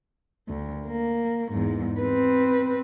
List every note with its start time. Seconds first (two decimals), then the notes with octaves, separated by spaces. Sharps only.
0.49 D2
0.88 A#3
1.52 E2 G#2
1.99 C4 B4